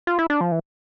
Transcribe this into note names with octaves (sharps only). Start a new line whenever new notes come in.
F4
E4
D4
F3
E3